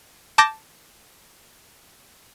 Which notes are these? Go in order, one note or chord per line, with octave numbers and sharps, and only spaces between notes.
A5 D6 G6 A#6